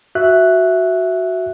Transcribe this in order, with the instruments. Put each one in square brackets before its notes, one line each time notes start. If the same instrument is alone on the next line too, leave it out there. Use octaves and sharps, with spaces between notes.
[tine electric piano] F#4 E5 F#6